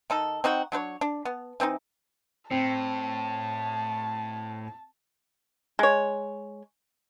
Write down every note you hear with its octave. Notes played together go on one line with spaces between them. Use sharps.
D#3 D#4 A4
C4 D#4 F#4 G5
F#3 D4 B4 C#5
D4
B3
E3 C4 D4 D#4
A2 C4 A5
G#3 C#5